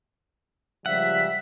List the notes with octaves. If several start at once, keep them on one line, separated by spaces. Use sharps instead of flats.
C#2 F3 G3 E5 F#5 B6